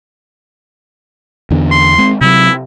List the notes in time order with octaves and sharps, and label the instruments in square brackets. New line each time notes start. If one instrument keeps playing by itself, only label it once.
[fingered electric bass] E2 D3 B3
[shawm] C6
[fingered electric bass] G#3 C4
[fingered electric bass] C3 F#3 [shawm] E4